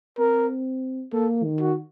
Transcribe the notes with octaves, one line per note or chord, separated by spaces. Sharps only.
C4 A#4
A#3 A4
D#3
F#4